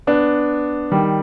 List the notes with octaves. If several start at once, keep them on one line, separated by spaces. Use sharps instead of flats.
B3 D4
D#3 G3